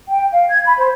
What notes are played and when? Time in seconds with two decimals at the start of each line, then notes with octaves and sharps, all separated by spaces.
0.08 G5
0.32 F5
0.49 G#6
0.66 B5
0.78 C5